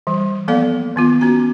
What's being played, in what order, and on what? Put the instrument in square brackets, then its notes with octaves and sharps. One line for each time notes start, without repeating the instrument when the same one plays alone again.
[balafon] E3 G3
F3 A#3 B3 A4 D5 F5
D#3 B3 F4
B3 C#4 F#4 A#5